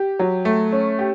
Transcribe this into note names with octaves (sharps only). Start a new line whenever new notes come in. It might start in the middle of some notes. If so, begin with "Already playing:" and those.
Already playing: G4
F#3
A3
C#4
G4